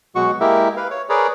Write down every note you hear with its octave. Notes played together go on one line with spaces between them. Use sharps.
B2 F#3 G#3 F#4 C#6
G#3 A#3 E4 G4 A#4 E5
B4 F5
C#5
G#4 A#4 B4 C#5 D5